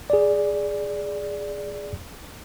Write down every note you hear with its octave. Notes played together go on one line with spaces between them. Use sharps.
G#4 D5